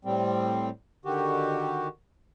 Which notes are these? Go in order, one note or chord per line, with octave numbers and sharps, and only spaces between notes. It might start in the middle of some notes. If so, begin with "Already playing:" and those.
A2 G3 C4
D3 D#3 F#4 G4